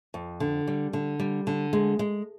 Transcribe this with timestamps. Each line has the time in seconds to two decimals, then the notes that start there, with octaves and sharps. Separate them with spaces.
0.14 F2
0.40 D3
0.68 G3
0.93 D3
1.20 G3
1.47 D3
1.73 G#3
1.99 G#3